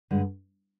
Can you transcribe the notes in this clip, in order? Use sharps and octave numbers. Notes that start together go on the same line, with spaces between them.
G2 D3 G#3